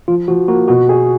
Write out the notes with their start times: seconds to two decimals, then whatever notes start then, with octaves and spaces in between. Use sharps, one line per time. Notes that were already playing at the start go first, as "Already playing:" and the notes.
0.08 F3 F4
0.28 F3 F#4
0.48 A#3 F#4
0.68 B2 F#4
0.89 G#4